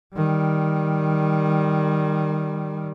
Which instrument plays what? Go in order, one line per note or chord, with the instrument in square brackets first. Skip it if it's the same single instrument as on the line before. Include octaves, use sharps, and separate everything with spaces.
[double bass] D#3 G3